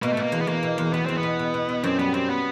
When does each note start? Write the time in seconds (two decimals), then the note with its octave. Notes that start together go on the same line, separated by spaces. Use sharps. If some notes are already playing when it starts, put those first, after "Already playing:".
0.02 B2 A#3
0.13 A3
0.17 B2
0.22 A#3
0.32 E2
0.41 B3
0.47 E2 A#3
0.63 B2
0.78 E2
0.93 E2 B3
1.06 E2 C4
1.17 B3
1.23 B2
1.39 B2
1.54 B2
1.69 B2
1.84 F#2 C4
1.99 G3 B3
2.14 F#2 C4
2.30 B3